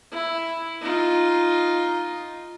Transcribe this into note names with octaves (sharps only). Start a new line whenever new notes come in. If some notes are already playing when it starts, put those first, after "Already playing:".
E4
D#4 F4